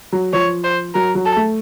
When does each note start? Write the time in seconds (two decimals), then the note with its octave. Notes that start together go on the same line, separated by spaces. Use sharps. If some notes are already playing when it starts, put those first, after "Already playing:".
0.12 F#3
0.33 F3 C#5
0.64 C5
0.94 F#3 A#4
1.15 F#3
1.26 A4
1.36 A3